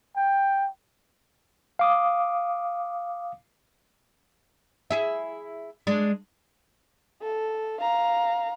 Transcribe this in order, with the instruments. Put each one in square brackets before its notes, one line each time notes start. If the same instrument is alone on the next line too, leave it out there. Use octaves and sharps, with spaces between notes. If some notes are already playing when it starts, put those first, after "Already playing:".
[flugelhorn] G5
[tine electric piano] F5 D6 D#6
[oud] E4 G#4 E5
G#3 D4
[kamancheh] A4
F5 A#5